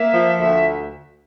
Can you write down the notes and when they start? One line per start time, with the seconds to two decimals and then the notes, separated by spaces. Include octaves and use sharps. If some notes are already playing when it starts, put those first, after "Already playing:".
Already playing: A#3 E5
0.14 F3
0.39 D2 E5